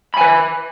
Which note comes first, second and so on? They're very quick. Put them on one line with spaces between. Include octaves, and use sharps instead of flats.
B5 G#5 B4